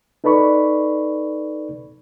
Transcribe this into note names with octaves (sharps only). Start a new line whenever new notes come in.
D#4 A4 B4 D5 B5 C#6